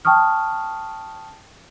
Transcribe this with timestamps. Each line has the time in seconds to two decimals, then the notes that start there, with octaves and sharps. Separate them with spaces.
0.05 G5 A5 C#6 D#6 F6